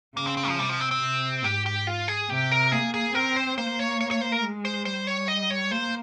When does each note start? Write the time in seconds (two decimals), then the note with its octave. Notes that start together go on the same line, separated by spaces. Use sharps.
0.16 C#3 A#3
0.27 C4
0.37 C4
0.48 F3
0.59 C3 G3
0.69 F3
0.80 C4
0.91 C4
1.02 C3
1.44 G#2 G4
1.66 G4
1.87 F4
2.08 G#4
2.30 C3 G4
2.52 A#4
2.72 A#3 G#4
2.94 G#4
3.14 C4 A#4
3.36 C5
3.57 A#3 C5
3.79 C#5
4.01 C#5
4.11 C#5
4.21 C5
4.32 A#4
4.43 G#3
4.65 C5
4.85 G3 C5
5.07 C#5
5.28 D#5
5.50 C#5
5.71 A#3 C5